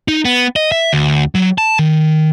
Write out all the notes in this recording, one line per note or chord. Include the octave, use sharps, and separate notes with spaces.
D#4
B3
D#5
E5
D2
F#3
A5
D#3